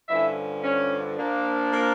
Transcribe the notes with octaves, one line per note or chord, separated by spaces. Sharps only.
G2 D3 F3 C#4 E4 E5
C#4 C#5
A#2 F3 A#3 D4
A#3 A#4